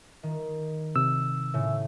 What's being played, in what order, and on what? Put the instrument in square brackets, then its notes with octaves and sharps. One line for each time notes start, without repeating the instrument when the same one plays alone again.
[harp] D#3
[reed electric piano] C3 [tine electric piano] E6
[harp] A2 C#3